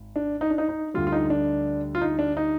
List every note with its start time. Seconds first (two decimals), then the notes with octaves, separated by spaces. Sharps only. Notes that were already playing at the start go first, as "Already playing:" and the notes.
Already playing: G#1
0.16 D4
0.41 D#4
0.50 D4
0.58 D#4
0.69 D#4
0.94 D2 D3 G3 F4
1.07 F4
1.12 D#4
1.30 D4
1.95 F4
2.01 D#4
2.19 D4
2.37 D#4